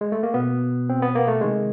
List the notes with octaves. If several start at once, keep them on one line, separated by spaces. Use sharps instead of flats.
G#3
A3
A#3
B2 B3
C4
B3
A#3
A3
C3 D#3 G#3